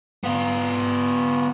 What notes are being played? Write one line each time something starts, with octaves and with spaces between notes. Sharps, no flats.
B3 F4